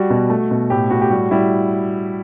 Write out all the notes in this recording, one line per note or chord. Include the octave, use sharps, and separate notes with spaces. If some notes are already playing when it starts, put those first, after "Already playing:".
Already playing: G3 F#4
B2
A3
B2
A2 G4
A2 F#4
G4
G3 F#4
G3 E4